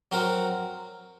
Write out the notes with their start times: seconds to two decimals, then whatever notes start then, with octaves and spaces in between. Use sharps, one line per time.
0.12 F#3 C4 F#4 A#4